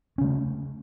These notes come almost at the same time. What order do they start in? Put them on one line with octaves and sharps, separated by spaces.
C#4 C#3 A3